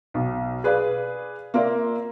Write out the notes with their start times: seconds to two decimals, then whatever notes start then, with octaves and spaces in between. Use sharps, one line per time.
0.14 B1
0.64 G#4 B4 D5 F5
1.54 A#3 F4 A#4 D5 E5